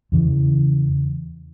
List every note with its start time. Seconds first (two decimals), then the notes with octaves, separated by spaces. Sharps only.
0.12 E2 C#3 E3